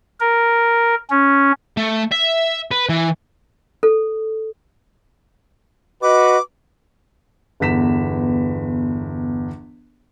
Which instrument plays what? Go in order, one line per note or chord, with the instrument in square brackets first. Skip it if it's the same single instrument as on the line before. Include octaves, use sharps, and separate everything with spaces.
[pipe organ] A#4
C#4
[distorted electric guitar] A3
E5
B4
E3
[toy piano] A4
[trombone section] F#4 B4 [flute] D#5 [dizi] D6
[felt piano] G1 E2 B6 E7